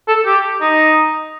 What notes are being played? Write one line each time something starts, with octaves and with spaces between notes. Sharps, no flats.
A4
G4
D#4